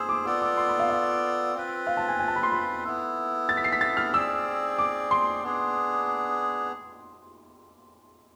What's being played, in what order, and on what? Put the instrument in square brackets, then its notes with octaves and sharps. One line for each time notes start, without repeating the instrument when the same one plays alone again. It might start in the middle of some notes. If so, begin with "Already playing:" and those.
Already playing: [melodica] G#4 C5 [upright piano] E6
[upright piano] D6
[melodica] B3 F4 A4 D5 [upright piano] E6
[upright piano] D6
C6
B5
F5
F5
[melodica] C4 F4 B4
[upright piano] F5
A5
G#5
G#5
A5
B5
C6
B5
[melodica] B3 E4 A4
[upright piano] A6
B6
C7
B6
A6
F6
[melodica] C4 G#4 D5 [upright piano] E6
[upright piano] D6
C6
[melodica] B3 D4 G#4